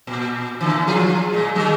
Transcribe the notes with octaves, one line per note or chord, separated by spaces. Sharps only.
A#2
A#2 D3 E3
F3 F4 G#4
A#2 G#3
D#3 F#3 G#3